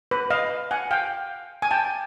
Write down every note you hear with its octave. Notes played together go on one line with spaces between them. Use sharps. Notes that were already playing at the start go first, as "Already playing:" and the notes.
B4
D#5 F5
F#5 G#5
F5 G5
G#5
G5 A5